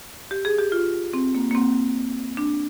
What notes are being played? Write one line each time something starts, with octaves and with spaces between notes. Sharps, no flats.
G4
G#4
G4
F4
C4
A#3
A#3
C4
D4